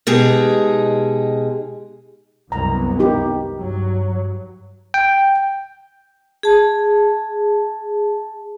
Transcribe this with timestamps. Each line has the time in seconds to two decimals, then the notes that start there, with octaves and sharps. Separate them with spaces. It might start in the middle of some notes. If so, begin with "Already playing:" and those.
0.07 B2 G#3 D#4 G4 G#4
2.52 C2 F#2 B3 A#5
3.00 D#4 G4 A#4
3.55 G2 F#3
4.94 G5
6.43 G#4 A5